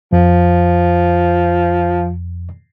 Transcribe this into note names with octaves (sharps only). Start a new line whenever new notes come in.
F2 F3